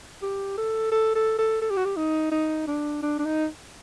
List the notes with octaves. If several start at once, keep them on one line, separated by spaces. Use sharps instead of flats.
G4
A4
A4
A4
A4
A4
G4
F#4
G4
D#4
D#4
D4
D4
D4
D#4